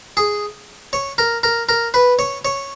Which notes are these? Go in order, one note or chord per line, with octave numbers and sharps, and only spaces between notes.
G#4
C#5
A#4
A#4
A#4
B4
C#5
C#5